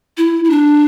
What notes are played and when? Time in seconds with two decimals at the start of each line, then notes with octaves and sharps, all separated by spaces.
0.18 E4
0.44 E4
0.50 D4